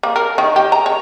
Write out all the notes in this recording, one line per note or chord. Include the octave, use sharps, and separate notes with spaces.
A#3
A#4
D#3
G4
A#5
C#5